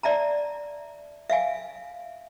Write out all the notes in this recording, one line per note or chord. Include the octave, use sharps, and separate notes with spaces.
D5 E5 A5 A#5
E5 F5 G#5